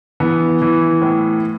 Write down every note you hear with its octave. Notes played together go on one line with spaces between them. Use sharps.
E3 B3
E3
A2